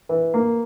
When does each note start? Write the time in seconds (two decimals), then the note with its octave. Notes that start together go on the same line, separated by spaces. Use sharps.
0.09 E3
0.34 A#3